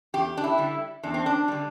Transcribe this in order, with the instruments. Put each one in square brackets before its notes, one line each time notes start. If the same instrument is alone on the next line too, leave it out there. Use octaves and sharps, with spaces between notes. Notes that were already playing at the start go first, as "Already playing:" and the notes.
[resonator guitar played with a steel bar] E2 G4
D4
E4
D3 G3
E2 D4
C4
D4
D3 G3